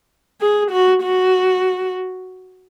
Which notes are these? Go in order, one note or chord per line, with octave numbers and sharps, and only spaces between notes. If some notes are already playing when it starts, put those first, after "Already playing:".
G#4
F#4
F#4